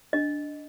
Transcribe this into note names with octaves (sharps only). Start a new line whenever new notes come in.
D4 D#5